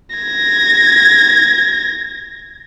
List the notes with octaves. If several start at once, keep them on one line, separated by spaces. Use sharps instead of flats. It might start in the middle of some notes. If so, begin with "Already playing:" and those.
G#6 A#6